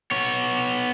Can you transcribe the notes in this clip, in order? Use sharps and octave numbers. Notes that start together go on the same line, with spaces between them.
B3 C#5